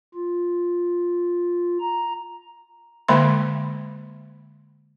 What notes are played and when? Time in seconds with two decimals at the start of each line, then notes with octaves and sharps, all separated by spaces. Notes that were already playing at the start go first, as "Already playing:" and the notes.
0.15 F4
1.80 A#5
3.08 D3 G#3 A#3 E5 C6